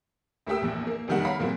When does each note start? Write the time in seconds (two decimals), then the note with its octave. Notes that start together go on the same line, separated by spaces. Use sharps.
0.47 D2 A3 A#3 G4 G5 E6
0.62 A#1 E2
0.87 A#3
1.08 F1 E2 D#3 G3 F#5
1.24 C#5 F5 A#5 B5
1.39 E2 A#2 F#3 A#3 C4